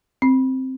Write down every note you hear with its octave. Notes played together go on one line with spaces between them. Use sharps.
C4